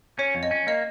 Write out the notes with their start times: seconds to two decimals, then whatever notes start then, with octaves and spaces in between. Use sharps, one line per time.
0.19 C#4 C#5
0.35 F2
0.43 D#5
0.51 C#4
0.67 A#3 D#5